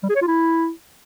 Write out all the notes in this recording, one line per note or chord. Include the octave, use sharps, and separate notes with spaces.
G3
G#4
C#5
F4
E4